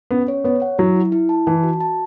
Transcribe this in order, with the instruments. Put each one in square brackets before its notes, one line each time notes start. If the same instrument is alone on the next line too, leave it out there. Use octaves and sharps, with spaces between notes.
[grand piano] B3 [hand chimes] C#4
[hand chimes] C#5
[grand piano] B3 [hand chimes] C#5
[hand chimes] F#5
[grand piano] F#3 [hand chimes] E4
[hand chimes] E4
E4
A5
[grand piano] E3 [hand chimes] A5
[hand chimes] F#4
A5